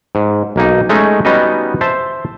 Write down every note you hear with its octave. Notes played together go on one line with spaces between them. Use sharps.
G#2
B1 A#3 D#4
G#3 A3 C#4 D#4
G3 B3 C#4 D#4 F#4 D#5
C5 E5 A5